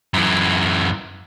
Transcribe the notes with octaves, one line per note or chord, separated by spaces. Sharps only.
F#2 E3